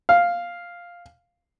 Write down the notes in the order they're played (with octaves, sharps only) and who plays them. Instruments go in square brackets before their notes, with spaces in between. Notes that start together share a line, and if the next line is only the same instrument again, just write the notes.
[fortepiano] F5